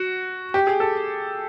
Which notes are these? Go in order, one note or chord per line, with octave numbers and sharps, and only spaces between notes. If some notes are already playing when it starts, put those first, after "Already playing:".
Already playing: F#4
G4
G#4
A4